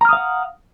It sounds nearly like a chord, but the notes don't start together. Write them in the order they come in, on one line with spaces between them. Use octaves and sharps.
A#5 F6 D#6 F5 F#5